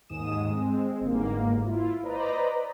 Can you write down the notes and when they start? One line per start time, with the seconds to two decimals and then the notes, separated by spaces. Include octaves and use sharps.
0.09 D#2 G#2 G#3 D#6 E7
0.50 G#3 C4
1.01 G1 G#2 A#3
1.64 E4 F4
2.03 B4 C5 D5 D#5 A#5 B5